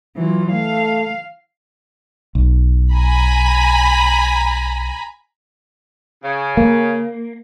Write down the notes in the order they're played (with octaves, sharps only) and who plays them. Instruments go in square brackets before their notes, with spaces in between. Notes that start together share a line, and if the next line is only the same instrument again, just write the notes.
[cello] E3 F#3 [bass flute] F4
[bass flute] A3 [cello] F5
[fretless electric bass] B1
[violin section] G#5 A#5 B5
[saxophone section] C#3
[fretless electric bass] A#3